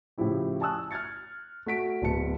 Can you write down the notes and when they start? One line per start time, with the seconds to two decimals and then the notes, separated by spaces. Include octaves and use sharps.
0.18 A2 C#3 F3 E4 G4
0.61 G#5 A5 C#6 D#6 E6 F#6
0.91 F6 F#6 G#6 A6 C#7
1.66 A3 F#4 B6 D7
2.02 D1 B3 A5 C#7